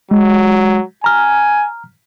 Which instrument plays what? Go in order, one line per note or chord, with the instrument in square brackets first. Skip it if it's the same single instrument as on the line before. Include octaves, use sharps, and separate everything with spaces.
[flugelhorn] F#3 [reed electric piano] G#3
[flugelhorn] G#5 [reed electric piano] A#5 F6